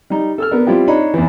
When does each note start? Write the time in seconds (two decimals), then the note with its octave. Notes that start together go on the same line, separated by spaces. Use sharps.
0.10 G3 D#4
0.38 A4 E6 F6
0.51 B3 D4 A#4
0.67 G3 C4 E4 F4 G4
0.87 D4 D#4 C#5 D#5 B5
1.14 E2 E3